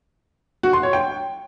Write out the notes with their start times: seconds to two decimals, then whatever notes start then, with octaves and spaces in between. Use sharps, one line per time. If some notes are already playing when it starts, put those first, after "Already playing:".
0.63 F#4
0.73 C6
0.83 C#5
0.93 G5